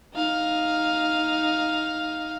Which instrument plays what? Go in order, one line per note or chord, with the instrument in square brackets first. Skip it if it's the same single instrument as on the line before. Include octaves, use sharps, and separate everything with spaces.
[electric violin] D#4 F5